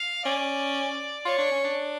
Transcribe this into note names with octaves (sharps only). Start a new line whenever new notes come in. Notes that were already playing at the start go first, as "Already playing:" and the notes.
Already playing: F5
C#4 D5
F4 C#5
D4
C#4
D4